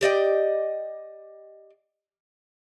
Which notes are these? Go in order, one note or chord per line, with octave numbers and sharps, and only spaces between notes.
G4 D5 D#5 G5